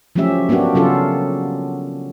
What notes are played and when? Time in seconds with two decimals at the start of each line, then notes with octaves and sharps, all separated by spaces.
0.16 F3 F#3 A3 C#4 G4 E5
0.49 A#3 B3 D4 F#4 G4
0.74 C#3 F#3 C#4 F4 A4